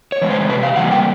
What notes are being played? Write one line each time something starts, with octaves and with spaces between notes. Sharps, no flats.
C#5
C#3 E3 G#3
C5
C3 B4
F5
E3 G3 A#3 F#5
G5